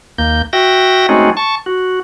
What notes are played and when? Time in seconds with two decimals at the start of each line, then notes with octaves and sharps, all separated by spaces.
0.18 D#2 A#3 G6
0.53 F#4 E5 G5 A#6
1.09 G#3 A3 C4 C#4 D#4 F#4
1.37 A5 C#6
1.66 F#4